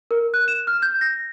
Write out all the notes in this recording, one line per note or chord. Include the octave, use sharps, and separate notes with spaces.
A#4
F#6
E7
F6
G6
A#6